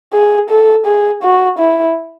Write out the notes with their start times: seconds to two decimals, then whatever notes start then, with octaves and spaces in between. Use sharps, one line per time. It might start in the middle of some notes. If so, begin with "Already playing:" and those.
0.13 G#4
0.50 A4
0.86 G#4
1.23 F#4
1.59 E4